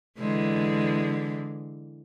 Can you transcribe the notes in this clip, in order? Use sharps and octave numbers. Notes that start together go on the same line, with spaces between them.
D3 E3 G#3